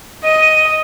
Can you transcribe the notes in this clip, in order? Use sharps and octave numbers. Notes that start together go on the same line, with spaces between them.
D#5 D#7